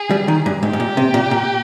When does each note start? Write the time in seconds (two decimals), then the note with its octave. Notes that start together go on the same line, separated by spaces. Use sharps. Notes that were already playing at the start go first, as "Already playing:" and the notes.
Already playing: G#4
0.11 G3
0.28 D#3
0.46 G2
0.63 G#2 G4
0.73 G#2
0.80 A#2
0.97 C3
1.14 A#2
1.31 A#2